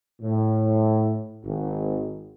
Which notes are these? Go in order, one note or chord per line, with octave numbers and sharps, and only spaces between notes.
A2
G#1